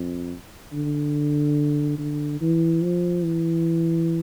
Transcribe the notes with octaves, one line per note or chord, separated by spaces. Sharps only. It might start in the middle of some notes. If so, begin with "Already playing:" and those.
Already playing: F2
D3
D3
E3
F3
E3